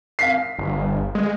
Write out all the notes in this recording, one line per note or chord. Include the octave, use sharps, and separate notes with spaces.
F5 B6 C7
G1
G#3